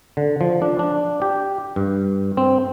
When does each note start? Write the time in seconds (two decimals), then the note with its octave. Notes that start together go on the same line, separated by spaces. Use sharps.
0.17 D3
0.41 F3
0.62 D4
0.79 D4
1.22 G4
1.76 G2
2.37 C4